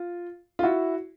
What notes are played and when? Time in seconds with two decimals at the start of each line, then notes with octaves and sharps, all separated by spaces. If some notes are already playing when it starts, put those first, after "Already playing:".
Already playing: F4
0.59 F4
0.63 E4 F#4